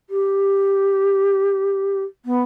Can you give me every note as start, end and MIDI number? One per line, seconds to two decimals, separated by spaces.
0.10 2.02 67
2.25 2.42 59